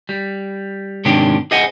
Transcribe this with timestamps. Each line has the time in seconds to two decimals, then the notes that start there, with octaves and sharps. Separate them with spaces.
0.09 G3
1.05 G#2 C3 D#3 C#4 D4 G4
1.51 G#4 C5 D#5 E5 F#5 G#5